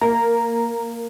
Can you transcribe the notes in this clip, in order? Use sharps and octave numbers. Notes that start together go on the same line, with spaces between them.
A#3 A#5